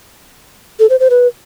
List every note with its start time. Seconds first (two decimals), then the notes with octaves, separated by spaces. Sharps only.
0.80 A4
0.90 C5
1.00 C5
1.10 B4